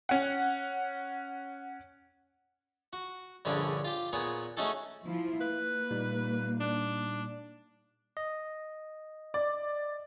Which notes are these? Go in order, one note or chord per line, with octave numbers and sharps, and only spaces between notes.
C#4 F#5
F#4
A#1 G2 D3 C#4 G#4
F4 G4
A#2 B3 G#4 C#5 A#5
A3 C#4 D#4 F#4 G#4 A4
F3 E4 F4
A#3 B4
A#2 G3 D#4
D4
D#5
D5